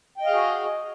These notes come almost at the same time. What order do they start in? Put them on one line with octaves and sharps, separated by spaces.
G5 D#5 F5 G#4 F#4